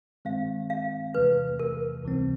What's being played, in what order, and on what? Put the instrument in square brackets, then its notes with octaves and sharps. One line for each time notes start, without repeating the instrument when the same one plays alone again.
[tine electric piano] G2 D#3 G#3 C4 [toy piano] F5
[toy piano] F5
[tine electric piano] E2 C3 E3 A3 [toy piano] B4
[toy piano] A#4
[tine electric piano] C#2 C3 E3 G3 C4